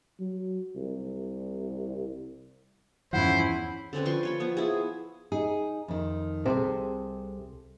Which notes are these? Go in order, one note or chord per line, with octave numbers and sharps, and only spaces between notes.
F#3
C2
E2 G2 D#3 F3 C#4 E4 C5 F#5
D3 C4 C#4 B4
F3 B4 C6 C#6
B4 C#5 B5
F3 B3
E4 G#4
D#4 G#4
F2 D#3
C2 C3 G#4 A4 C5